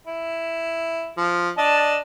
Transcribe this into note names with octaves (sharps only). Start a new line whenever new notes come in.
E4
F3
D4 D#5 A5